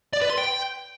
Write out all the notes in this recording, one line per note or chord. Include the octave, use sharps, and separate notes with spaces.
D5
B4
C6
G5